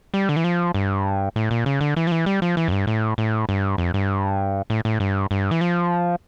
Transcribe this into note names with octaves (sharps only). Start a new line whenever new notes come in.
G3
D3
E3
F3
G2
A2
A#2
C#3
D3
E3
F3
E3
G3
F3
E3
F2
G2
A2
A2
G2
F2
G2
A2
A2
G2
G2
E3
F3